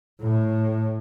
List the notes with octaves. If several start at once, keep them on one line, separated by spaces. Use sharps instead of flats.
A2